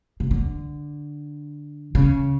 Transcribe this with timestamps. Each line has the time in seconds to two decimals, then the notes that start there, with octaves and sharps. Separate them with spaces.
0.20 C#3
0.31 D3
1.95 C#3